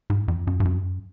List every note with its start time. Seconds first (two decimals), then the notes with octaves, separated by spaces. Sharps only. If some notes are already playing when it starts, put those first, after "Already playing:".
0.10 G#2
0.28 F2
0.47 F#2
0.60 G2
0.65 F#2